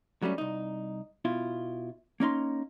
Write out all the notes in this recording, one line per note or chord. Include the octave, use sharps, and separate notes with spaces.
F#3 G3 A3 C#4
C2 D#4
B2 E4 F4
A#3 C#4 D#4 C6